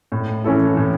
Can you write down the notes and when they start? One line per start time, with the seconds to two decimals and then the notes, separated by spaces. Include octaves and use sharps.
0.12 A2
0.44 E3 C#4 E4 A4
0.77 A2